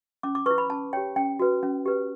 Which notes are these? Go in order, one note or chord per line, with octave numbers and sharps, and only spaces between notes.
C#4 D6
D6
E4 B4 C#6
B5
C#4 A5
G4 C#5 G5
C#4 G5
F#4 B4
C#4
G4 B4